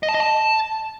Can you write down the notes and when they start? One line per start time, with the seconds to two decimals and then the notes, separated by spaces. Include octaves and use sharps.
0.03 D#5
0.09 A5
0.14 D#5
0.20 A5